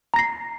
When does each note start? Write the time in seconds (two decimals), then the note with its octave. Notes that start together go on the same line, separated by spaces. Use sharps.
0.14 A#5
0.16 A#6
0.19 C7